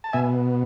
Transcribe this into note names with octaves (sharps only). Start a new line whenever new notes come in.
A5
B2 E5 G#5